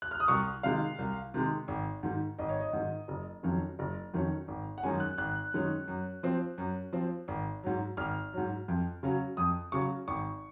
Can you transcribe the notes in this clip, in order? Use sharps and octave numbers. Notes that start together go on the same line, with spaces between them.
F#6
F6
D#6
C2 C#6
C3 D#3 G#3 F5
C2
C3 D#3 G#3
G#1
G#2 D#3
G#1 D#5
C#5
D#5
G#2 D#3
F#1
F2 D#3 F#3 C#4
F#1
F2 D#3 F#3 C#4
G#1
F#5
F#2 D#3 G#3 C#4 G#5
F#6
G#1 F#6
F#2 D#3 G#3 C#4
F#2
F3 C4
F#2
F3 C4
G#1
G#2 F#3
G#1 F6
G#2 F#3
F2
C#3 F#3 C#4
F2 D#6
C#3 F#3 C#4 C#6
G#1 C#6